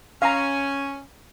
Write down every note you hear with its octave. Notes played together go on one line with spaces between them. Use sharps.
C#4 F5 A#5